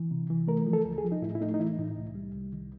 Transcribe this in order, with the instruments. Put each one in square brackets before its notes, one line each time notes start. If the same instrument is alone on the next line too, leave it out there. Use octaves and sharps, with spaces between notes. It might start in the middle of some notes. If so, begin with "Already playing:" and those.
Already playing: [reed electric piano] E3
C3
E3
A3 A#4
F3
A4
C#2
G#4
F3
D#4
A2 E4
E4
A3 D#4
D#4
E3 E4
A2
C2
G3
C2
D#3